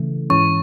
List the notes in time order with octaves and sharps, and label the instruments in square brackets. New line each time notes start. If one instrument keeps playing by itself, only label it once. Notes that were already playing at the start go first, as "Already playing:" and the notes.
Already playing: [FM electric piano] C#3 E3 A3
[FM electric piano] G#2 E3 G#3 C#4 [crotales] C#6